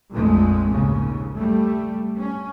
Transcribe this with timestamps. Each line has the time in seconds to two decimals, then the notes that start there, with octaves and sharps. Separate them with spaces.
0.12 A#1 F2 A#2 G#3 A3
0.68 D#2 G#2 C#3
1.37 G3 A3
2.18 C#4